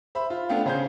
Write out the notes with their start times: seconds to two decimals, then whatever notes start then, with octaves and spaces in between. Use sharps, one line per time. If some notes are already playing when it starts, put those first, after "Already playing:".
0.15 C5 E5 B5
0.30 F4
0.49 A3 B3 D4 F5 G5
0.66 C#3 G#4 C5 F5 G6